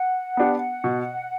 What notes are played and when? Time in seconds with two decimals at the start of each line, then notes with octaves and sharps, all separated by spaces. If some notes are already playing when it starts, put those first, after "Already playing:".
Already playing: F#5
0.37 B3 D4 G4
0.84 B2